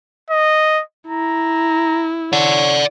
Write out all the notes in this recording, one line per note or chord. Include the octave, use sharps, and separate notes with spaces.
D#5
E4 A#5
C#5 D5 F#5